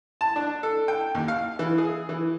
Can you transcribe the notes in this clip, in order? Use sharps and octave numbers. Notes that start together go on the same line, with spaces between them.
A5
D4
A4
G5
D#2
F5
E3
G#4
E3